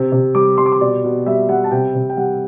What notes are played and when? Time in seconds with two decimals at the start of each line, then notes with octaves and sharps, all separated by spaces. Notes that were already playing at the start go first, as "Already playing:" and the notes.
Already playing: C3
0.12 C3
0.35 G3 D6
0.58 G3 C6
0.66 D6
0.72 C6
0.80 B2 D5
1.04 B2
1.26 G3 E5
1.49 G3 F#5
1.64 A5
1.71 C3 G5
1.95 C3
2.10 G5
2.17 G3 F#5